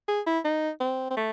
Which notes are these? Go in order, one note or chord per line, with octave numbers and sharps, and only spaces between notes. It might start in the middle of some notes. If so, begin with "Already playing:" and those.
G#4
E4
D#4
C4
C4
A3